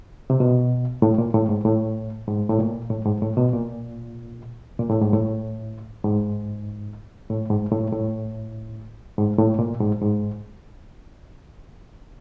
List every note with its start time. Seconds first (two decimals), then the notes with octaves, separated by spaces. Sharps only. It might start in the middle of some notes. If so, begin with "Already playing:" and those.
0.30 C3
0.40 B2
1.02 A2
1.18 A#2
1.34 A2
1.49 G#2
1.65 A2
2.28 G#2
2.49 A2
2.59 A#2
2.90 A2
3.06 G#2
3.22 A2
3.37 B2
3.53 A#2
4.79 A#2
4.89 A2
5.01 G#2
5.13 A2
6.05 G#2
7.30 A2
7.51 G#2
7.72 A2
7.92 A2
9.18 G#2
9.38 A2
9.59 A#2
9.81 G#2
10.01 G#2